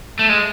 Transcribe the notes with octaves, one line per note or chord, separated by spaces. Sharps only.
A3
G#3